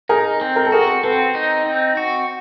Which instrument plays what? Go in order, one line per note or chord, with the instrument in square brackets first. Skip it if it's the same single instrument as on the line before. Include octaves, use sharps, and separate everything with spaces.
[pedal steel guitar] D#4 [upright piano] G#4 A#4
[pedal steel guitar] C4
[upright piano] A#4
A4
[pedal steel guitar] F#4 [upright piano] G#4 A#4
[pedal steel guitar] C4 [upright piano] A4 B4
[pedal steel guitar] D#4
C4
F#4